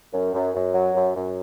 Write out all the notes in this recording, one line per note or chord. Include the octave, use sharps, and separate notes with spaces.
F#2
F#2
F#2
F#3
F#2
F#2